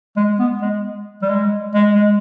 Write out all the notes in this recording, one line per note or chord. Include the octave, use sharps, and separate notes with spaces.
G#3
B3
G#3
G3
G#3
G#3
G#3